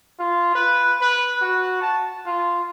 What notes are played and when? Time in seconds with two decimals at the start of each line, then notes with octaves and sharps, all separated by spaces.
0.19 F4
0.55 B4
1.01 B4
1.42 F#4
1.81 A5
2.26 F4